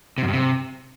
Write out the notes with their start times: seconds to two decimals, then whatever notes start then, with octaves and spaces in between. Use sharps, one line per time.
0.18 C3
0.23 F#2
0.28 G2
0.33 C3